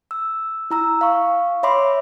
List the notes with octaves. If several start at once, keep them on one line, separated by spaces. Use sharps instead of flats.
E6
E4 A#5 E6
F5 C#6
C#5 E5 B5 C6 D6